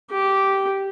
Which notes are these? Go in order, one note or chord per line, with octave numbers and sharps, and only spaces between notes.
G4